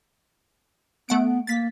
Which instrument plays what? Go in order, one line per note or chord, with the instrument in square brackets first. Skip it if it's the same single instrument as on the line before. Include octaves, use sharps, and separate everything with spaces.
[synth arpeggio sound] A3 F#5 D7 [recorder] B3
[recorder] A#3 [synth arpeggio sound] A6 B6